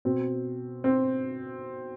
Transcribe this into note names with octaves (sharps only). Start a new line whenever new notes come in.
B2 C4
C4